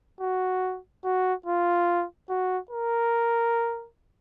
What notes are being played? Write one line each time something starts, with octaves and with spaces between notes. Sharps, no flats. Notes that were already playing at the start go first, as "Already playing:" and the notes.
F#4
F#4
F4
F#4
A#4